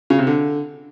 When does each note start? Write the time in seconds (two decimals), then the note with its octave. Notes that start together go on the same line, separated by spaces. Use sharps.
0.10 C#3
0.19 C3
0.27 D3